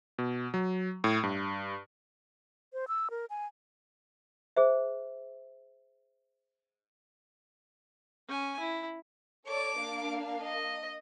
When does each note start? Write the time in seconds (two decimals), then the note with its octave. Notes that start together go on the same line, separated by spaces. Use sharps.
0.18 B2
0.54 F#3
1.04 A2
1.23 G2
2.73 C5
2.88 E6
3.10 A#4
3.30 G#5
4.56 G#4 C5 E5
8.28 C#4 G#5
8.59 E4
9.47 A4 C#5 D5 D6
9.80 A#3 D4 F5
10.42 D#5